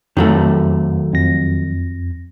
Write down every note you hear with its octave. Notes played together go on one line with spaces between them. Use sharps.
F2 D#3 F#3 A3
F2 A#6